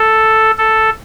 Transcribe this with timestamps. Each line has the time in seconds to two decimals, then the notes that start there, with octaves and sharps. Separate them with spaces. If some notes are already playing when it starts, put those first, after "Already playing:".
Already playing: A4
0.58 A4